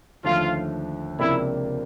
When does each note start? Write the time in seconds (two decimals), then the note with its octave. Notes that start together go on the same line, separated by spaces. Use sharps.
0.24 D#2 D3 F3 A3 F4
1.19 C#2 C3 F3 A#3 D4 E4